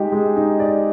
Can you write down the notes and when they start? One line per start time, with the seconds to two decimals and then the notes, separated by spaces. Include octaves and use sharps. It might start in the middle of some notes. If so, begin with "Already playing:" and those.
Already playing: G#3 D#4 G4
0.12 G#3
0.36 D#4
0.60 D5